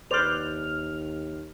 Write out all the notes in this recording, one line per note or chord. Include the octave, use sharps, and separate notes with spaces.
D#2 B4 C5 D5 F6 F7